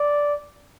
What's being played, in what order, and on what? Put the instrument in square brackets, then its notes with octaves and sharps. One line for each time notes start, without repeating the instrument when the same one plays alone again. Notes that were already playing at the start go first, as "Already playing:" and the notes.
Already playing: [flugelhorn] D5